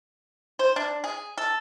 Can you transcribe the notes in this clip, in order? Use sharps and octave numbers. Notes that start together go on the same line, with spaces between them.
C5
D4
G#4
A4